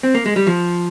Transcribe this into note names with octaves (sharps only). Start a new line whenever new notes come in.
C4
A#3
G#3
G3
F3